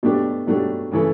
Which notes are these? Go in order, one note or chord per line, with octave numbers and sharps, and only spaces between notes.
B2 F#3 A3 D4 G4
B2 F#3 A3 D4 G4
C#3 E3 A3 E4 A4